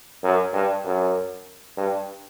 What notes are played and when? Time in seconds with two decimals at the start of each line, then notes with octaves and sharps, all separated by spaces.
0.23 F#2
0.53 G2
0.84 F#2
1.77 G2